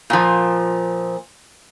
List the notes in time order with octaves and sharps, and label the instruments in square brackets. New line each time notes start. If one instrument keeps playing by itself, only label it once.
[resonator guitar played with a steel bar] A#2 F3